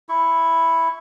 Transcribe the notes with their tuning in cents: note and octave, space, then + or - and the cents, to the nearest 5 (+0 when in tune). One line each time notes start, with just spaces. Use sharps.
E4 +0 C#6 +0